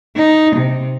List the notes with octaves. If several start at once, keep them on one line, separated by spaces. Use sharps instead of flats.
D#4
C3